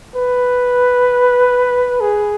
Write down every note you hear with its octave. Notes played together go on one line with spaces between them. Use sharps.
B4
G#4